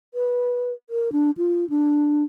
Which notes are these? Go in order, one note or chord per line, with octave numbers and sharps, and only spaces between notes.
B4
A#4
D4
F4
D4